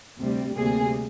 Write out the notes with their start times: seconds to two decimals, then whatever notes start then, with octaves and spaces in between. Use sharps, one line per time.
0.19 D2 C3 G3
0.56 D2 C3 G3 A#3 G#4